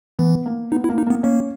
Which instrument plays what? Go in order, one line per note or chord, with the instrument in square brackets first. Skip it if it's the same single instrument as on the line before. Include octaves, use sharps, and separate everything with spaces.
[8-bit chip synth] E3 [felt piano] B3
[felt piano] A#3
[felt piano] B3 [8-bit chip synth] D#4
[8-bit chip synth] E4
[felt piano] A#3
[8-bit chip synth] D#4
[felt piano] A#3 [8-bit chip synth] B3
[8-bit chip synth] A#3 [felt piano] C#4